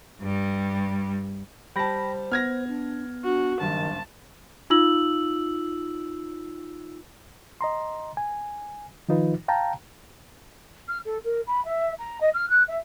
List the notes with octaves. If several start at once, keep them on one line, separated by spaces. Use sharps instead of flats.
G2 G3
G3 C5 G5 A5 B5 A#6
B3 F6 G#6 A#6
D4
D4 F#4
F#1 G2 D#3 A5
D#4 F4 E6 F#7
D#5 A#5 C6
G#5
D#3 F3 D#4 F4 B4
F5 G5 A5 A#5
F6
A4
A#4
B5
E5
A#5
D#5
F6
F#6
E5